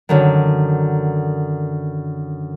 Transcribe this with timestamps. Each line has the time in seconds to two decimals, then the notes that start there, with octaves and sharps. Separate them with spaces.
0.09 F#2 D3 D#3